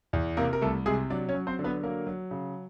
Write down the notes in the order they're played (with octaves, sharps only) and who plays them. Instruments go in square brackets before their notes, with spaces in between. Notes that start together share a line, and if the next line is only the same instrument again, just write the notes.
[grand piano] E2
C3 A#3 A#4
A#4
C2 A3 A4
C3 G#3 G#4
F#3 D4 D5
C#4 C#5
F#3
C4 C5
D3
B3 B4
F#3 A#3 A#4
F#3
C#3